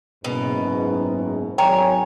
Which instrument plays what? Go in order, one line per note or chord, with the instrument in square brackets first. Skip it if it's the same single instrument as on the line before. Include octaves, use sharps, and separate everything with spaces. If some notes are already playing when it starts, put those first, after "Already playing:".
[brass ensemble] F#1 G#2 [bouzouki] B2
[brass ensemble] G#1 F#3 G#5 [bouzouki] C#5 [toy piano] G5 A#5